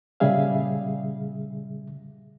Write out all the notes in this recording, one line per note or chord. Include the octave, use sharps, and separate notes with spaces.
A#2 C#3 G3 G#4 E5 F5